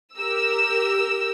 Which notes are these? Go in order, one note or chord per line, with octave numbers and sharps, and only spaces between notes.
G4 A#4 E6